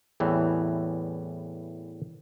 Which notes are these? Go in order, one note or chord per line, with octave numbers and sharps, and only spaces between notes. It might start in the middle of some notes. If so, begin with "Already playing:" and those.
E2 A2 E3 G3 C4